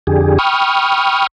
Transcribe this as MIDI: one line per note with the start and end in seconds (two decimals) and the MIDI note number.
0.07 0.38 41
0.07 0.38 50
0.07 0.38 67
0.07 0.38 68
0.39 1.27 79
0.39 1.27 83
0.39 1.27 85
0.39 1.27 87
0.39 1.27 89